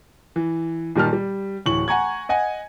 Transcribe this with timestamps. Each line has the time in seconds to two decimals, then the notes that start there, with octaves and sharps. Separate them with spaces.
0.36 E3
0.95 A#2 D#3 G3 A5 F6
1.13 G3
1.66 D1 E3 C#6 F#7
1.88 F#5 G#5 A#5 C#6 G#6
2.29 D#5 F#5 G#5